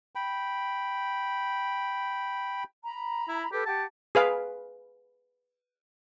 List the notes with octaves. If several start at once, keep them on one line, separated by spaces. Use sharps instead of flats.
G5 B5
A#5 B5
E4
G4 A4 B4
G4 F#5 A5
G#4 B4 F5